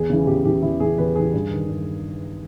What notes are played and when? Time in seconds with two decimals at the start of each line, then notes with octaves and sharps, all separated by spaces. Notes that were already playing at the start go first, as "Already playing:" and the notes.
Already playing: E2 G#4
0.10 C#3 E3
0.27 E2 G4
0.45 C#3 E3 G4
0.62 E2 E4
0.80 C#3 E3 G#4
0.98 E2 B4
1.16 C#3 E3 G#4
1.33 G2
1.51 D#3
1.69 G2